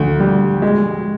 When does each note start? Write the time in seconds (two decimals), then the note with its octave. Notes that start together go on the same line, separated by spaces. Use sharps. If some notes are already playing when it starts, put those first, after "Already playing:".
Already playing: D2
0.20 G3
0.62 G#3